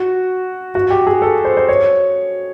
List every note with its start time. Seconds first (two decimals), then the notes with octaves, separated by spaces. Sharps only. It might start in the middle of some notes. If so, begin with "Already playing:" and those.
Already playing: F#4
0.75 F#4
0.90 G4
1.07 G#4
1.22 A4
1.45 C5
1.57 C5
1.69 C#5